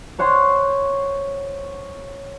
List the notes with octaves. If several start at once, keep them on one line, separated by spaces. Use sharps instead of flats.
C5 C#5 F#5 C6